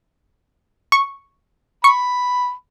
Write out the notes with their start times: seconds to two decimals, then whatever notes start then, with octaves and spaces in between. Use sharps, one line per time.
0.92 C#6
1.84 B5 C#6